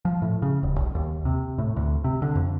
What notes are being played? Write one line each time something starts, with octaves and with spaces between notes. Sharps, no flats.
F3
A2
C#3
D#1
B1
D#2
C3
A2
D2
C3
D3
F2